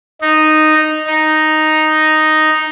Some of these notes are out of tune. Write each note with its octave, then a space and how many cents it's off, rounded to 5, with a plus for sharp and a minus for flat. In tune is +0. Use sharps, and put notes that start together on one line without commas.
D#4 -5
D#4 +0